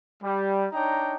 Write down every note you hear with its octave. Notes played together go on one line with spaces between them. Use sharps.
G3
D4 D#4 C#5 G5 A#5